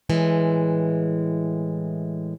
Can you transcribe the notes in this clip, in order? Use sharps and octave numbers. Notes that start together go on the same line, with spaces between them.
A2 E3 G#3